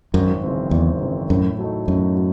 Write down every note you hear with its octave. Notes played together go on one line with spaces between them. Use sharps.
G#1 F#2
F#2 C#3 E3 C4
G#1 E2
F#2 C#3 E3 C4
F#2 A2
F#3 A3 D#4
F#2 A2
F#3